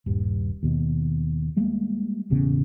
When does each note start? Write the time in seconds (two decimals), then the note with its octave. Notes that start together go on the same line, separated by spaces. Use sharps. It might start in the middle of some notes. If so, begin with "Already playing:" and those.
0.06 D#1 G2
0.63 D#2 B2
1.57 G3 G#3 A#3 B3
2.30 E1 A1 C#3 B3